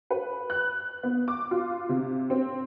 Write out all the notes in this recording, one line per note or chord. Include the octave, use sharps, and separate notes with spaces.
B4
F#6
B3
D6
F4
C3
C4